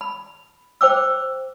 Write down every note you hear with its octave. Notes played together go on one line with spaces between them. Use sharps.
B5
C5 G5 D6 E6